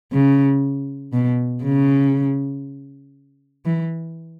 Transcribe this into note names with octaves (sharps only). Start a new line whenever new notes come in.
C#3
B2
C#3
E3